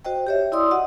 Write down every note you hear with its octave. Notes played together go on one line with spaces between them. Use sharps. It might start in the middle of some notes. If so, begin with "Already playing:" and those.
F#4 C5 D#5 G5
G4 C#5 E5
E4 D5 D#5 C6 D#6 E6
F#4 D#5 F#5